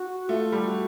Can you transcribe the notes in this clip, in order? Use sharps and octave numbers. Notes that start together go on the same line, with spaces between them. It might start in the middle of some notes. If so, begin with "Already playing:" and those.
Already playing: F#4
A3 F4
G3
F#4